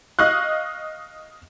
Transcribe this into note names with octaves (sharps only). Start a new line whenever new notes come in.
D#5 F5 C#6 F#6